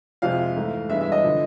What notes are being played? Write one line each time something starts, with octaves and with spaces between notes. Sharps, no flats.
F2 C3 F3 G#3 F5
G#2 E3 A3
G2 E3 G#3 B3 E5
E5
D#5
D3 F3